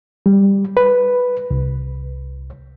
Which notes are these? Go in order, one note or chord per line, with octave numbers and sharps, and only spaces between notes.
G3
B4
C2